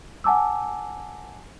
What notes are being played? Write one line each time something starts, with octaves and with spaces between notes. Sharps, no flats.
F#5 G#5 A5 D6 E6